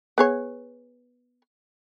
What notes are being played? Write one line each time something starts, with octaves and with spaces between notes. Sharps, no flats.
B3 G#4 C#5